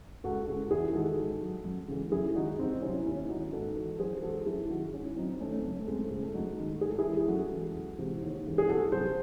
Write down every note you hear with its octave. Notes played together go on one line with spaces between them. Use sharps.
C#2 F#4 A4
C#3 G#3 F#4 A4
E2 E4 G#4
D#3 G#3 F#4 A4
G#2
F#3
F#2
C#3 E3 G#3
F#2 E4 G#4
D#3 G#3 D#4 F#4
C2 C4 D#4
C3 F#3 C#4 E4
D#2 C#4 E4
D#3 G#3 D#4 F#4
G#2 F#4 A4
E3 G#3 F#4 A4
F#2 G#4 C5
E3 G#3 F#4 A4
F#2 E4 G#4
D#3 F#3 D#4 F#4
G#2 C#4 E4
F#3 C4 D#4
D#2 A3 C#4
C4
C#3 F#3 A3 C#4
A3
C#2 G#3 C4
A3
C#3 G#3
A3
F#2 D#4 F#4
D#3 G#3
G#2 G#4
A4
E4 G#4
E3 G#3
G#4
F#2 F#4 A4
E3 G#3
C#2
C3 E3 G#3
D#2
C#3 E3 G#3
G#4
C2 F#4 A4
C3 F#3 G#4 C5